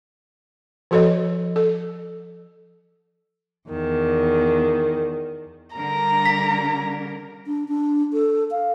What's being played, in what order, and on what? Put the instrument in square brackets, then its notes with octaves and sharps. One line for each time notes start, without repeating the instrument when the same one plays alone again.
[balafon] F3 F#4 A4 C#5 D#5
A4
[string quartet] E2 D#3
[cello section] D3 G3 A#4 [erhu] A#5
[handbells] B6
[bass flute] D4
D4
A4
F5